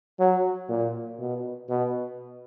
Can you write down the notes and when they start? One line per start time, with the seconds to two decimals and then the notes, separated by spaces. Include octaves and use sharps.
0.20 F#3
0.69 A#2
1.19 B2
1.69 B2